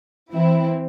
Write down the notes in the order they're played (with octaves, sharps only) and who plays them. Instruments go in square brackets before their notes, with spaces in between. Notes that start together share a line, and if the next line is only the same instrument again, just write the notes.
[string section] E3 C4 E4